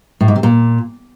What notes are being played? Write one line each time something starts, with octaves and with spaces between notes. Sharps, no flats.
A2
G#2
C3
A#2